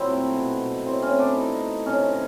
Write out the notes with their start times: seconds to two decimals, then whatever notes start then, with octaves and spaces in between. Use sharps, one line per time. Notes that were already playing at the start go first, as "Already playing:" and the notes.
Already playing: A#2 F#3 C4 E4 F#4
0.11 A3
0.36 B2
0.60 B2
0.85 A2 C4
1.02 C#4
1.10 A3
1.19 D4
1.36 E3 D#4
1.61 A3
1.86 C3 C#4
2.11 D#3